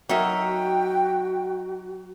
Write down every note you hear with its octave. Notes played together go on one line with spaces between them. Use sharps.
F#3 D#4 F#4 A4 A#4 E5 G5